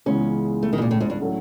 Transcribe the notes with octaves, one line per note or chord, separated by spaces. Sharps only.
C#2 C#3 E3 G#3 B3 C#4
A3
D#3
B2
A#2
A2
G#2
G2
A2 F#3 A3 C#4 F#4